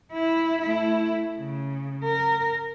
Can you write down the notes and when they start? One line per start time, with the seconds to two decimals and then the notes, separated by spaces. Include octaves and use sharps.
0.13 E4
0.62 A3 E4
1.39 C#3
2.04 A#4